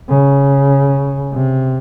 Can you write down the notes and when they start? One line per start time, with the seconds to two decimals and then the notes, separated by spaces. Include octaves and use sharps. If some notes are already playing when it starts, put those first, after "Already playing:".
0.09 C#3
1.33 C3